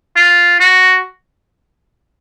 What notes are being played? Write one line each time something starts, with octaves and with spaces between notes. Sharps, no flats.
F4
F#4